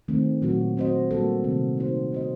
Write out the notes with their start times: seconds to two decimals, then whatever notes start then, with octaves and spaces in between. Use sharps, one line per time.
0.08 D#3 A3 C4
0.42 A#2 F#3 A3 C4 F#4
0.77 F#3 C4 F#4 C5 D#5
1.11 G3 A#3 F#4 A4
1.44 C3 D#3 A3 C4
1.78 A#3 D#4 F#4 C5
2.13 C4 F#4 C5 D#5